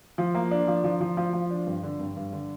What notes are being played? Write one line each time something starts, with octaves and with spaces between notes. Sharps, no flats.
F3
A#3
D4
F3
F3
F3
F3
F3
D4
G2
D3
G2
G2
D3